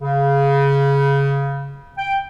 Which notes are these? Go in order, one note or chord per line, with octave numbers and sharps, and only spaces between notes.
C#3
G5